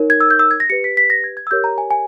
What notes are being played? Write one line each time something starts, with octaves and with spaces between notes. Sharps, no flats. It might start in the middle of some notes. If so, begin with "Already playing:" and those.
Already playing: D#4 A#4 C#5
G#6
E6
G6
E6
G#6
A#6
G4 B4 C#7
B6
B6
A#6
G#6
G#6
E6
G4 A#4 C#5 G6
A#5
G#5
G#5